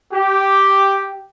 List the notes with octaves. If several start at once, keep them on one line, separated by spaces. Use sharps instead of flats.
G4